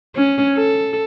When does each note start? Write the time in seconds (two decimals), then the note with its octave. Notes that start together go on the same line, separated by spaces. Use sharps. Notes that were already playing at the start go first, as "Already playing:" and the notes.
0.16 C#4
0.56 A4